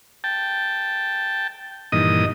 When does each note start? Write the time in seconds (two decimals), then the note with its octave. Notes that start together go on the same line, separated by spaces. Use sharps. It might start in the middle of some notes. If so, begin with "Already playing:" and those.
0.24 G5 A5
1.92 G2 A#2 D#3 E3 D#5 D#6